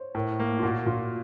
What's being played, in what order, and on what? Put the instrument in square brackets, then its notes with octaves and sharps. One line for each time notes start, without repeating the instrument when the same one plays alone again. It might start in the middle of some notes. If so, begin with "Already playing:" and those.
Already playing: [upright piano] C5 C#5
[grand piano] A2 [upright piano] A#4
[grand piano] A#3
[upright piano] F4
[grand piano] A#2 [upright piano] F#4
[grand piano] A#2 [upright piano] F4